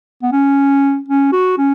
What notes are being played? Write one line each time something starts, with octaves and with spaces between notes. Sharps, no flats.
B3
C#4
C#4
F#4
C#4